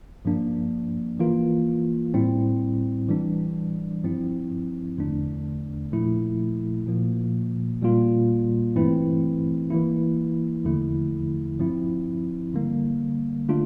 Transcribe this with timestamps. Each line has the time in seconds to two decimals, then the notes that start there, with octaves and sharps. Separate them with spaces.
0.25 G2 F3 A#3 D4
1.19 E3 A#3 F4
2.14 A2 G3 C4 E4
3.09 E3 G3 D4
4.03 G2 F3 C4 E4
4.98 E2 D3 A3 D4
5.92 A#2 F3 A3 E4
6.87 A#2 F3 A#3
7.82 A#2 G3 A#3 F4
8.76 G2 E3 A3 C4 E4
9.70 E3 A#3 E4
10.65 E2 D3 F3 A3 E4
11.59 G2 F3 C4 E4
12.54 D3 G3 A#3
13.49 D3 A3 D4 F4